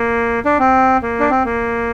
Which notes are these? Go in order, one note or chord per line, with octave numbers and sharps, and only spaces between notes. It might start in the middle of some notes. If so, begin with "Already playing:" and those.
Already playing: A#3
D4
C4
A#3
D4
C4
A#3